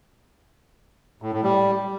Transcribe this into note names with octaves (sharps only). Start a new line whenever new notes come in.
A2
A2
G3